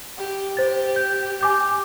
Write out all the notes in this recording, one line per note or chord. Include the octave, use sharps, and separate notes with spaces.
G4
C5 A6
G6
G4 G#5 D6 G6